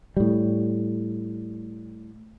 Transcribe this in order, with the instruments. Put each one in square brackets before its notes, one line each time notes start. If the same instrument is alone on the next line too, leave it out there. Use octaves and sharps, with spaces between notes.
[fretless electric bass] A2 G3